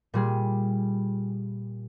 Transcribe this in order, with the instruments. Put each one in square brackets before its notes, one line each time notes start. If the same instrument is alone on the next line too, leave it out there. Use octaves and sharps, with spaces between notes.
[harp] A#2 G3 G#4